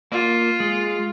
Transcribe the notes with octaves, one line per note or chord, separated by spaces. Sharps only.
A#3 F4
G#3